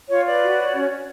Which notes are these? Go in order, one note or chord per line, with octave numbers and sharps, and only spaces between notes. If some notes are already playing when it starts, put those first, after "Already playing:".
F4 C#5
B4 D5
F#4
C#5
C#4
C#4